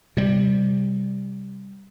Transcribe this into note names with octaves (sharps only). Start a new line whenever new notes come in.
C3 G3